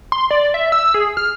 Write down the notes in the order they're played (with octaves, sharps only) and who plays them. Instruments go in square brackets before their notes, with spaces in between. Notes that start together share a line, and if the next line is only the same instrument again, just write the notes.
[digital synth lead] C6
D5
E5
E6
G#4
F6